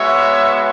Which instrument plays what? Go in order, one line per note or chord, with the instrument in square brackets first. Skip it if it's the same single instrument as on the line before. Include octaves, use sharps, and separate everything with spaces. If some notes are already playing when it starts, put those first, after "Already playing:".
Already playing: [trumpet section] G#3 B3 F#4 C#5 E5